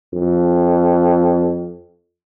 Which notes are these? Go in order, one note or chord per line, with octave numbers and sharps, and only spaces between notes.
F2